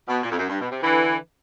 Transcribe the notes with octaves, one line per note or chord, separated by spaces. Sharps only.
B2
A#2
F2
F#2
G2
B2
C3
D3 E3